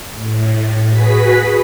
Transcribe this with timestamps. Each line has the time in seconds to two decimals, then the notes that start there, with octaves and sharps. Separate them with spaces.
0.13 A2
0.86 F#4 G#4 B4 B6